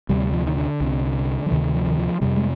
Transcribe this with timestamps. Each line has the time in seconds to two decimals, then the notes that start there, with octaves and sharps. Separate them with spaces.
0.09 D2 C3 G3
0.33 F3
0.47 D#3
0.57 D3
0.80 C2 C3
1.46 F3
1.51 D2 C3 D#3
1.75 F3
1.87 D#3
1.98 F3
2.21 F2 C3 G3
2.37 G#3